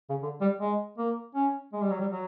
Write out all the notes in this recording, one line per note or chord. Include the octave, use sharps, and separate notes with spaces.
C#3
D3
G3
G#3
A#3
C#4
G#3
G3
F#3
G3
F#3